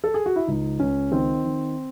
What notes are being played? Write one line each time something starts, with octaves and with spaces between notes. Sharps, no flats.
A4
G#4
F#4
E4
C#2 D#4
C#2 C#4
D#3 C4
D#3